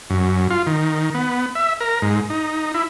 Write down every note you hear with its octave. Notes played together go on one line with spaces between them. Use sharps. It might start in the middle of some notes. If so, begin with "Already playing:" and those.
F#2
F4
D#3
B3
E5
A#4
G#2
D#4
E4